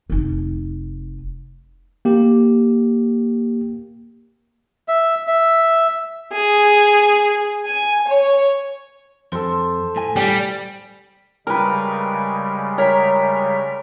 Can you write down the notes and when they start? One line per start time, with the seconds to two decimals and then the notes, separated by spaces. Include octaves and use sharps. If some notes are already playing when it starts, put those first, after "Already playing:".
0.10 F1 D#4
2.05 A#3 G4
4.88 E5
5.27 E5
6.32 G#4
7.66 G#5
8.07 C#5
9.32 F2 A4 C5
9.96 A2 G#5
10.16 G3
11.47 C#3 G3 G#3 A#4 B4
12.78 A#4 C#5 A#5 B6